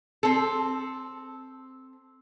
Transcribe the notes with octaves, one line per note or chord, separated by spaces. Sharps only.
C4 A4